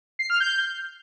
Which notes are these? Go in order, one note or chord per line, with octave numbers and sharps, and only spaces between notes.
C7
F6
G6